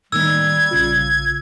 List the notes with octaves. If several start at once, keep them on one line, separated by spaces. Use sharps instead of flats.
A2 D#3 G3 A#3 E6 G#6
A#1 C#3 F4